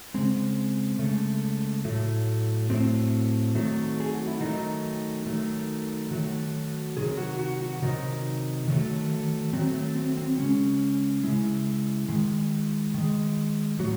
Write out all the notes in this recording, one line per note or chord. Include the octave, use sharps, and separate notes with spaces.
C#3 G#3 C4
C#3 G#3 A3
A2 F#3 A3
A2 F#3 A3 C4
D#3 F#3 A3
G#4
F#4
E4
D#3 F#3 A3 D#4
D#3 F#3 A3
D#3 F#3 A3 F#4
C3 D#3 F#3 G#4
F#4
F#4
F#4
C3 D#3 F#3 D#4
D#3 F#3 A3
D#3 F#3 A3 C4
A3
C4
C4
C#3 G#3 C#4
C#3 G#3 E4
D#3 G#3
D#3 G#3
A2 F#3 F#4